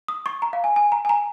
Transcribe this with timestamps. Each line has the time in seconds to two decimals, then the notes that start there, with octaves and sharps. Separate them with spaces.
0.08 D#6
0.26 C#6
0.42 A#5
0.53 F5
0.64 G#5
0.76 G#5
0.92 A#5
1.05 G#5
1.09 A#5